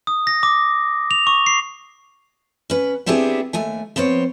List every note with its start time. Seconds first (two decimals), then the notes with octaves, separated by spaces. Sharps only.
0.07 D#6
0.27 A#6
0.43 D6
1.11 F7
1.27 C#6
1.46 C7
2.70 C#4 B4
3.06 B3 C4 D4 E4 G4 G#4
3.53 D#2 A3 G#5
3.96 F3 B3 C4 C5 C#5